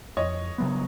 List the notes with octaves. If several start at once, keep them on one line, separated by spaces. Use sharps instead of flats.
F2 C#5 D#5
C#3 F#3 B3